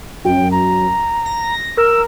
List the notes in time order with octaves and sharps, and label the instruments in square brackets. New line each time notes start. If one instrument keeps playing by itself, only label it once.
[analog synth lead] F#2 [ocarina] G5
[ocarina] A#5
[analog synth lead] A#6
[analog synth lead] A#4 [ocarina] E6